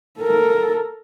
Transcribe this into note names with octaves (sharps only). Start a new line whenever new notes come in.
A4 A#4